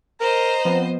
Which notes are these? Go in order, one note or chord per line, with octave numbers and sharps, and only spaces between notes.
A#4 C5 D#5 A#5
F3 B3 C4